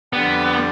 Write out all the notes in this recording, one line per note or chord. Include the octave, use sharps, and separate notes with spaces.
F2 D3 G3 B3 D4 G4